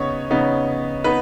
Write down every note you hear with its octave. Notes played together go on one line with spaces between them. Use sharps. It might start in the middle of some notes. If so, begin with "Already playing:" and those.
Already playing: C#3 B3 D#4 C#5
C#3 B3 D#4
B3 D#4 B4